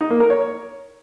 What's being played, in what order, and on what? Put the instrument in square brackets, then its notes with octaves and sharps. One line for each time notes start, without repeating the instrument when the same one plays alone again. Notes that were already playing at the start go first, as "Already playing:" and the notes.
[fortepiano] D#4
A#3
A#4
C#5